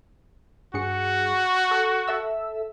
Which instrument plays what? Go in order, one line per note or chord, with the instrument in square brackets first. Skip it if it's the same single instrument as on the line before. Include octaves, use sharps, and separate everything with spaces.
[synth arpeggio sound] G2 G#4 C#7 [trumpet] F#4
[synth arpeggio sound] A4
A4 E5 E6